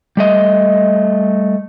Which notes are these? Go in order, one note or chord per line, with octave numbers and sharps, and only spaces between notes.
G3 A3 D#5